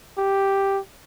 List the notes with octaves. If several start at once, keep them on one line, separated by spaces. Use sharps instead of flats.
G4